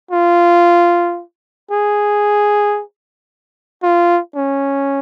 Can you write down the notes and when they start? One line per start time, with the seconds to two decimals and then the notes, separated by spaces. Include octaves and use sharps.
0.11 F4
1.71 G#4
3.83 F4
4.35 C#4